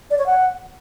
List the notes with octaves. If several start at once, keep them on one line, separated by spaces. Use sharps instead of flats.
D5
C#5
F#5